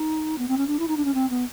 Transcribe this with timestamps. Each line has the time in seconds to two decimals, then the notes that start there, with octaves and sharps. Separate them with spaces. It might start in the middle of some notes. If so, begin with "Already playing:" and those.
Already playing: D#4
0.38 B3
0.48 C4
0.57 C#4
0.67 D4
0.79 E4
0.88 D#4
0.97 D4
1.05 C#4
1.14 C4
1.30 B3